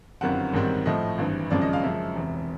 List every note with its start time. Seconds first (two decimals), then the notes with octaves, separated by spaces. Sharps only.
0.21 G1 F#2 D#3 G3 C4 F#5
0.53 A1 G#2 D#3 G3 C4
0.86 A2 F3 A3 D#5
1.18 G#1 G2 E3
1.50 G#1 F#2 C#3 F3 G#3 D5
1.62 D#5
1.73 F5
1.83 F#2 C#3 F3 G#3 E5
2.16 E1 E2 C3